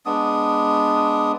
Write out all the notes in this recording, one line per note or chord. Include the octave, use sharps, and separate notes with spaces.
G#3 B3 D4 D#6